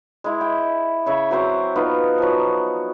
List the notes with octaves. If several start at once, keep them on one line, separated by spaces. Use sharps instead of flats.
G#3 E4
G5
C#3 C#5 E5
F#3 C4 C5 G5
B3 D#4 F4
F3 F#3